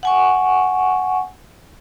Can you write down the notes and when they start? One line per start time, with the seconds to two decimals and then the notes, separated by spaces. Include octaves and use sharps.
0.03 F#5 G#5 C#6